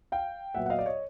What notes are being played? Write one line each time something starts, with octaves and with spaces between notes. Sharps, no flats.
F5 G5
A#2 F#3 B3 E5 F#5
F#5
D#5 F5
D5
C#5 D#5